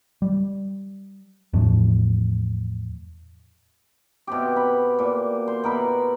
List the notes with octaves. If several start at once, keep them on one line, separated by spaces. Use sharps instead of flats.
G3
E2 A2 F3
B2 C4 G4
B5
A#2
C5
B2 A#4 B5